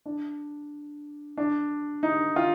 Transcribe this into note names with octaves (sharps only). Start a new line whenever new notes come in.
D4
D4
D#4
F4